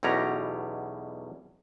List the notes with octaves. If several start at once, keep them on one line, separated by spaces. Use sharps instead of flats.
B1 E2 B2 C#4 G4 A#5